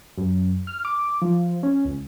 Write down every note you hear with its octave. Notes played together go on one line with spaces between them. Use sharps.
F#2
F6
D6
F3
C#4
C#2